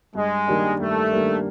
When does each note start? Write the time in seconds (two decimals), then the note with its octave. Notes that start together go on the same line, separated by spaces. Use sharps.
0.15 G2 G#3
0.48 D#3 G3 A#3 D4
0.80 G2 A3
1.12 D#3 G3 A#3 D4